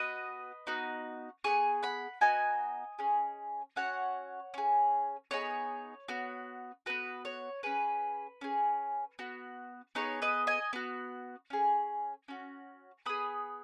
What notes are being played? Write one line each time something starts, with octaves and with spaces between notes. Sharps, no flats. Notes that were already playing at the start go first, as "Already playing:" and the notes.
Already playing: B3 F#4 B4 D#5
B3 D#4 F#4
B3 D#4 G#4 G#5 C#6
F#5 B5
B3 D#4 F#4 D#5 G#5
C#4 G#4
C#4 F#4 C#5 F#5
C#4 G#4
B3 D#4 G#4 C#5
B3 F#4
B3 F#4 B4
C#5
C#4 G#4 B4
C#4 G#4
B3 F#4
B3 D#4 G#4 C#5
B4 D#5
D#5 G#5
B3 F#4
C#4 G#4
C#4 F#4
B3 G#4 B5 D#6